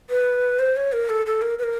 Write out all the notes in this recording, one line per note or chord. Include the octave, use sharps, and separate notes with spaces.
B4
C5
C#5
A#4
A4
A4
A#4
B4
A#4